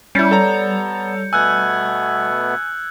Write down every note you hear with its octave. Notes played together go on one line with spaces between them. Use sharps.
G3 C#4 E4 G6 C#7
B3 A4 C#5 A#5
B2 A3 B3 G#5 E6 F#6 G#6